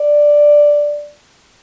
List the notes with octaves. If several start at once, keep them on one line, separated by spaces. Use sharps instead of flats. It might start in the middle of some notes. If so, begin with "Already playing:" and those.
Already playing: D5